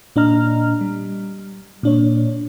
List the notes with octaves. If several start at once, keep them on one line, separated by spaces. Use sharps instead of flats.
A#2 D4 D#5 A#5 F6
G3
A#2 D4 C#5